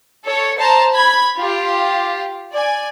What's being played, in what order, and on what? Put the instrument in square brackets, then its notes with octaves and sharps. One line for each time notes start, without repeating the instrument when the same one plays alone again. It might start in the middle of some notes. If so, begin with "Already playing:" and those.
[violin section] A4 C#5
C5 A5 A#5
B5 G#6
F4 G4
D5 G#5